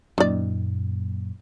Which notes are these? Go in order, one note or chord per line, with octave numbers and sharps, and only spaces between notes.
F#2 A#2 D#3 D5